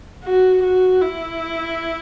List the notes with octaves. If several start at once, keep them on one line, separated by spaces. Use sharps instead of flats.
F#4
F#4
E4